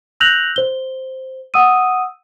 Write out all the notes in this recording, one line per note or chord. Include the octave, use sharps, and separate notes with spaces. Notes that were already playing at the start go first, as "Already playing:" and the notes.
E6 F#6 G6 A#6 F7 F#7
C5 G7
F#5 D#6 E6 D#7